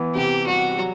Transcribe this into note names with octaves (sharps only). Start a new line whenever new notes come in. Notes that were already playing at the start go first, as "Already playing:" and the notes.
Already playing: E3 B3
C3 G4
G3 F#4
F#3